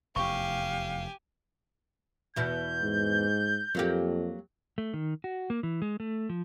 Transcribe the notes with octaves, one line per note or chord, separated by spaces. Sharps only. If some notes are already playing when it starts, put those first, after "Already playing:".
F1 E2 G4 F5 G#5 C#6
E2 B2 E4 G6
G#2
F2 F#3 A#3 G4
A3
D#3
F#4
A#3
E3
G#3
A3
F3